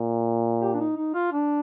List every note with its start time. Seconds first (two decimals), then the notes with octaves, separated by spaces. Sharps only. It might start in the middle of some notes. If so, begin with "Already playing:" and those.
Already playing: A#2
0.61 G4
0.74 D4
0.80 D#4
0.97 D#4
1.14 F4
1.32 D4